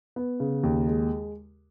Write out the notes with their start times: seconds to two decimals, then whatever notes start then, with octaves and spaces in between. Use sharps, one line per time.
0.16 B3
0.40 C#3
0.63 D#2
0.87 G#3